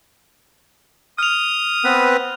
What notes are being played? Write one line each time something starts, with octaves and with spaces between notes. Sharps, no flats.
D#6 F6 F7
B3 C4 B4